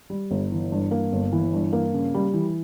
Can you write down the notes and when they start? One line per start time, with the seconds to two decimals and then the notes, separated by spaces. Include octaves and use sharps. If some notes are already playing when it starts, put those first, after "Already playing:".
0.10 G3
0.31 G1
0.52 E3
0.72 G2
0.91 A#3
1.13 G1
1.33 E3
1.53 G2
1.73 A#3
1.94 C#3
2.14 G3
2.34 E3